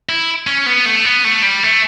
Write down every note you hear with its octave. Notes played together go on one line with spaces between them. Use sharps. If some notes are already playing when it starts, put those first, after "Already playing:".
E4
C#4
B3
A3
B3
A3
G3
A3